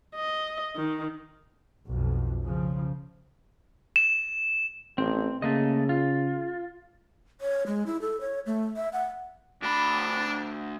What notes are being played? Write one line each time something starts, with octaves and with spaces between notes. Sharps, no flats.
D#5
D#3
B1 F2
C#3 F3
E7
A1 C4
C#3 A3 A#3 D#5
F4
C#5
G#3
E4
A4
C#5
A3
E5
F#5
D2 D4 B5